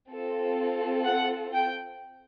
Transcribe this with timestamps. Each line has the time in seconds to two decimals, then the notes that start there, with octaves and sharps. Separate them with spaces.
0.10 C4 F4 A4
1.05 F#5
1.53 G5